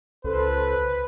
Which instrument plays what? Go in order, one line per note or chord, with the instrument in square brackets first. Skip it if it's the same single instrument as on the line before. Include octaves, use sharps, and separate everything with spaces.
[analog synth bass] C#2 [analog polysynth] A4 C5 [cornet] B4